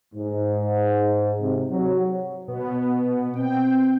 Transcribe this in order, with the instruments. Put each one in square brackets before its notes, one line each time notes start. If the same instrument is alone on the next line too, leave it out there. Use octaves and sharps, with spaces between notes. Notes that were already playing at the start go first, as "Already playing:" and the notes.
[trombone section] G#2
C3
F#3
[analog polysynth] B2 B3
[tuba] C4 [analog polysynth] G5